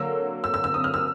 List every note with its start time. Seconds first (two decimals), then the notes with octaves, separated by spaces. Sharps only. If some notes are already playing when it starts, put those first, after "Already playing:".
Already playing: D3 F#3 A#3 E6
0.44 E6
0.54 E6
0.64 E6
0.74 D#6
0.84 F6
0.94 E6